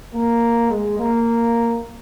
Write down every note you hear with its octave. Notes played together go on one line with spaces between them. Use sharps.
A#3
G#3
A#3